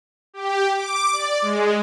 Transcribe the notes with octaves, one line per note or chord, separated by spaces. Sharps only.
G4
D6
D5
G#3